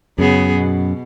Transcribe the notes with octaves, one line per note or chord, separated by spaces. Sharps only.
F#2 C#3 B3 G#4
B2